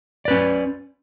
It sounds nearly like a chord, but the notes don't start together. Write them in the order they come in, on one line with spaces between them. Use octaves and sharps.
D5 B4 C#4